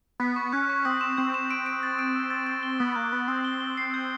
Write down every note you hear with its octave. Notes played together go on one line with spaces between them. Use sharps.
B3 B6
C#6
C#4 F#6
C#6
C4 D#6
E7
C4 G6
E7
D7
D7
A6
D7
E6
A6
A6
G7
B3 D#6
A#3 F#6
B3 D#6
C4 D#6
G7
G7
C7
G6